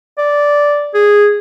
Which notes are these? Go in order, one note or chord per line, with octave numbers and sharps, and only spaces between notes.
D5
G#4